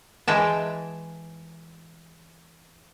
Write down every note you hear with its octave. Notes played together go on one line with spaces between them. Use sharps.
E3 G#3 G5 A5